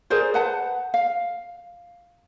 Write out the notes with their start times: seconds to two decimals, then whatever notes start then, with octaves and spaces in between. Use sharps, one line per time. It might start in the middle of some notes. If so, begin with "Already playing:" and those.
0.10 G#4 A#4 C5 D5
0.34 B4 F#5 A5
0.94 F5